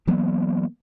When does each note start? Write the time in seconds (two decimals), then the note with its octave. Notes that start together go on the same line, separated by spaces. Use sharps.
0.07 E3 F#3 A#3 B3